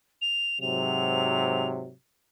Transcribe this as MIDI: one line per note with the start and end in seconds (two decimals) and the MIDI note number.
0.22 0.59 101
0.61 1.93 44
0.61 1.93 48
0.61 1.93 54
0.61 1.67 101